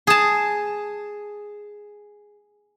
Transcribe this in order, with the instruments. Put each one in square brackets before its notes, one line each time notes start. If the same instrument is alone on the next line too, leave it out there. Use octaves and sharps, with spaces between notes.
[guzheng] G#4 A5